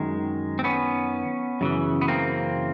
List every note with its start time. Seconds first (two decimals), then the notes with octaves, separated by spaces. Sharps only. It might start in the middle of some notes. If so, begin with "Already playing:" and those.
Already playing: F#2 D#3 G#3
0.59 C4
0.64 B3 C#4
1.61 F#2 C#3 E3
2.01 B3
2.08 A#3 C4